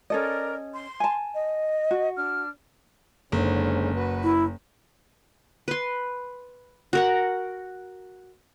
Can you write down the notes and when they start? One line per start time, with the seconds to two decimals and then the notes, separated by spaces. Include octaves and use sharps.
0.10 C#4 A4 A#4 D5 D#5
0.72 C6
1.00 G#5 A5
1.33 D#5
1.91 F#4
2.15 D4 F6
3.32 F#1 G#2 D3 C#4
3.95 F#4 B4
4.23 E4
5.68 B4 C6
6.93 F#4 A#4 F#5